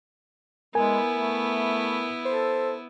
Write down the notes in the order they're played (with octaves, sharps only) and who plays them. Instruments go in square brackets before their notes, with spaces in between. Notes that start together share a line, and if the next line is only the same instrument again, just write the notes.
[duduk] G#3 [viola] B3 E4 [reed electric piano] A#4 G#5
[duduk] A3
[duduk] A4 [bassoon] C5